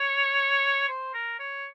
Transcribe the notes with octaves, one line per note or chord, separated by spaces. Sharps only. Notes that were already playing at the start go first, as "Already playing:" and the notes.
Already playing: C#5
C5
A#4
C#5